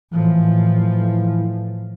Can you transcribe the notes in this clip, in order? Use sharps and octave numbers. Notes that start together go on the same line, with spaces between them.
A2 E3 F3